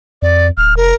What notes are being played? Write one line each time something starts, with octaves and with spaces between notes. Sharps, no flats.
F2 D5
D1 F6
F1 A#4